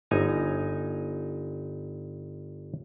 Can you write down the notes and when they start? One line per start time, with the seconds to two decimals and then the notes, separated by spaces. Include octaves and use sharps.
0.11 G1 D#4 G#5 A#5